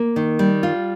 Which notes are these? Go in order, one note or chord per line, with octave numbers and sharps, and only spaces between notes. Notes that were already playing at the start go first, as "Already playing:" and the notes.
Already playing: A#3
D#3
G3
F4